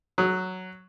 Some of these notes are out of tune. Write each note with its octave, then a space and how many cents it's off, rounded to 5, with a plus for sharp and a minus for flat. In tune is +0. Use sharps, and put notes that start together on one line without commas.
F#3 +0 D#6 +40